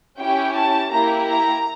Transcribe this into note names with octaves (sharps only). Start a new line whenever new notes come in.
C#4 E4 G4 G5
A5
A#3 E4 G4 A#5
A#5